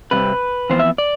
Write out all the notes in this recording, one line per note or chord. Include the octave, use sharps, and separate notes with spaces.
C3 G3 C4 B4
F2 E3 B3 C5
E5
D5